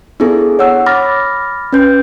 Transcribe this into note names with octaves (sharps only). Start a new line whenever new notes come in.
B3 D4 E4 G#4 A4
C#5 F#5 E6
B5 D6 F6 A6 A#6
C#4 B4 G6